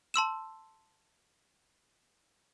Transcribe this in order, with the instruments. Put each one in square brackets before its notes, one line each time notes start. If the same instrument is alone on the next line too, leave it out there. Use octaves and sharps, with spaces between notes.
[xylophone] A5 C6 E6 E7